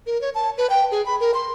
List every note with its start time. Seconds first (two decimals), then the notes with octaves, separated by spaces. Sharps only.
0.06 A#4
0.21 C#5
0.35 A5
0.58 B4
0.70 G5
0.92 G#4
1.06 B5
1.20 A#4
1.34 C6